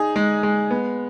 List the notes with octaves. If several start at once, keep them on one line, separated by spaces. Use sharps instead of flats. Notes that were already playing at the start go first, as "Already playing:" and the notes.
Already playing: D#4 G#4
G#3
G#3
B3